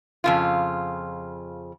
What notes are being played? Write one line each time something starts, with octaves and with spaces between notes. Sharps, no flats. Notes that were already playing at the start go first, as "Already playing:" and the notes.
F2 C#3 F4